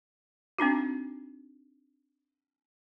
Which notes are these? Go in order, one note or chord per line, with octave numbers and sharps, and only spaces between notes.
C4 D4 D#4 F#4